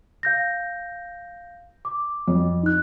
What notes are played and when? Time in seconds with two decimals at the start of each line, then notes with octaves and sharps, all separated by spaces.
0.23 F5 G6 A#6
1.85 D6
2.28 F2
2.63 D#4 F#6